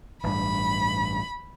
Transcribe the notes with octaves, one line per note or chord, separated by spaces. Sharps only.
A1 G2 B5